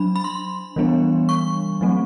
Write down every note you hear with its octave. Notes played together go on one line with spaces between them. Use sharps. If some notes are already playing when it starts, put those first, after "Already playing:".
Already playing: F#3 D4 B5
B5
C6
E3 G3 B3 D4
C#6
F#3 A3 C4